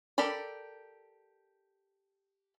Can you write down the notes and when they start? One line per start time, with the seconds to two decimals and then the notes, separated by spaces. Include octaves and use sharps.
0.18 G4 A4 A#4 D5 B5